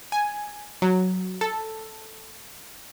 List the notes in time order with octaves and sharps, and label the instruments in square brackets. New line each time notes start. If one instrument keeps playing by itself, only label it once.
[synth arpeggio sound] G#5
F#3
A4